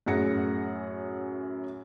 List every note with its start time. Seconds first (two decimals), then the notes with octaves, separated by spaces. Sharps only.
0.06 F#2 A2 G#4 F#5 A#6 C#7